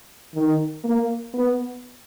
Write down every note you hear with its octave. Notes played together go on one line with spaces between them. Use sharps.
D#3
A#3
B3